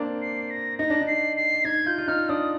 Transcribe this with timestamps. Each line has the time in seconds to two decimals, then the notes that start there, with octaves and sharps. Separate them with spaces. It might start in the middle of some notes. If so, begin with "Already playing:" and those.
Already playing: A#3 C4 D4
0.22 C7
0.50 A#6
0.79 D#4 A#6
0.90 D4
1.01 D#4
1.07 C7
1.36 C7
1.65 D#4 G#6
1.86 F4 G6
1.98 F4
2.08 D#4 F6
2.29 D4 D#6